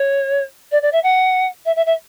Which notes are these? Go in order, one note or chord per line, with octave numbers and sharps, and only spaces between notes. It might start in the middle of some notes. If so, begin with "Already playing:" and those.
Already playing: C#5
D5
D5
E5
F#5
E5
E5
E5